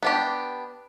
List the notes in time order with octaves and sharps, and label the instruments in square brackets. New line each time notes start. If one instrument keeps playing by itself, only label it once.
[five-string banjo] B3 D4 G4